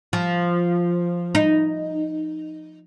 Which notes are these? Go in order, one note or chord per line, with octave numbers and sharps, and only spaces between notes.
F3
D#4